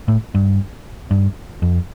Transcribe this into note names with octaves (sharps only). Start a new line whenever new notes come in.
A2
G2
G2
F2